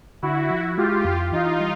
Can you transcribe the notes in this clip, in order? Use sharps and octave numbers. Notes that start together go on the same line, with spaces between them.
D3 E4 F#4
F3
G#3 F4 G4
F2
E3 D#4 F4
G3